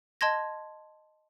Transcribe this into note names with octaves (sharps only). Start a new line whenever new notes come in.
D#5 A5 C6 G#6 A#6